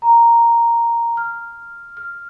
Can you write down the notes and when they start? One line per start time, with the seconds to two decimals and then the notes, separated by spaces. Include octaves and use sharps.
0.02 A#5
1.17 F6
1.97 F6